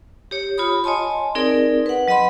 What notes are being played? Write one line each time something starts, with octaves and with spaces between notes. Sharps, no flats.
G4 C#5
F4 C#5 B5 D#6
C#5 D#5 G#5 A5 C6
C4 D#4 G#4 A#4 D5
B4 F#5
F#3 D#5 F#5 B5 C6